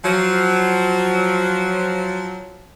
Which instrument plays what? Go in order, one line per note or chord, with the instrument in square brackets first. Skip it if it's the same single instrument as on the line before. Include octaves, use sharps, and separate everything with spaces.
[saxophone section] F3 F#3